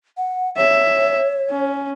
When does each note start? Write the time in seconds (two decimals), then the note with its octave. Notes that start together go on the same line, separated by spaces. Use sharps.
0.17 F#5
0.57 C#5 E5
1.50 C#4